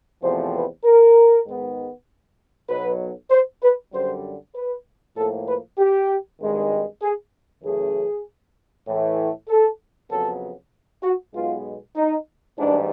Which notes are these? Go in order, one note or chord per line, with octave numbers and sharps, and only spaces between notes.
E2 C3 F3 A3 C4 C5
B4
A#4
G#2 D#3 G#3 B3
B1 B2 F#3 B4
C5
B4
F#2 D3 G3 C5
B4
A2 F3 A#3 A4
B4
G4
G#1 G2 D#3 G#3
G#4
F#2 C#3 E3 A3 G#4
A2 E3 A3
A4
F2 C#3 F#3 B3 A4
F#4
B1 B2 G#3 B3 F4
D#4
A1 G#2 E3 G3 D4